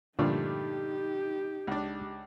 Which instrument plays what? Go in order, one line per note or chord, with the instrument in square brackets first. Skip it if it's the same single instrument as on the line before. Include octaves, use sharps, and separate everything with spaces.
[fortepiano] G2 A3 D4 [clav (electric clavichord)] A#2 D3 F3 [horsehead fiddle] D#4 G4
[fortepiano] C#2 D4